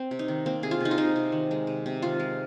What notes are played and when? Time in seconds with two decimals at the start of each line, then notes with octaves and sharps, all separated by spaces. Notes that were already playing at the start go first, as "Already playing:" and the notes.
Already playing: C4
0.11 C3
0.19 D#4
0.28 D#3
0.46 A#3 C4
0.63 C3 G#4
0.71 F4
0.80 C3 D#4
0.91 F4
0.98 C3 D#4
1.16 C3
1.32 D#3
1.51 G#3
1.67 C3
1.86 C3
2.02 D#3 F4
2.20 G#3